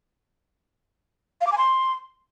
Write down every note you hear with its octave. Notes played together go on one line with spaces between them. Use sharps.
F5
D6
G#5
C6